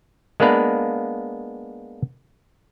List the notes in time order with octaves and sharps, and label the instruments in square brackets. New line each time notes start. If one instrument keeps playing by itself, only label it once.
[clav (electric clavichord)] G#3 A#3 B3 D4 B4 F5